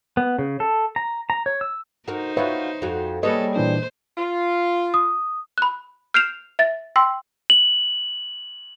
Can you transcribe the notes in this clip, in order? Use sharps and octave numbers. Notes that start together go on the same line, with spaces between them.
B3
C#3
A4
A#5
A#5
C#5
E6
D#4 F#4 A#4 C5
F4 F#4 B4 C#5 E5
F2 F#4
G3 A#3 G#4 A4 B4 C#5 D#5
A#2 E3 D4 C5
F4
D#6
B5 F#6
F6 G6 C7 D7 E7 F7
E5 A6
G5 C6 E6
F#7